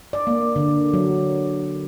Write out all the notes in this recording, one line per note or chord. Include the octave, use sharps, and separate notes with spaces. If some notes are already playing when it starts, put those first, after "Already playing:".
D5
A#3
D3
F#3